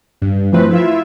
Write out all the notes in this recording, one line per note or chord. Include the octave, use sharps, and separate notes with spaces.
G2
E3 F3 A3 C4 B4
E4 F4 E5